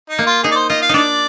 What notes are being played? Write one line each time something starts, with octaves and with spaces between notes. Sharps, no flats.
D#4
A#3
F4
D#4 G#4
D5
C5
F4 D#5
F5
D4 D#4 D5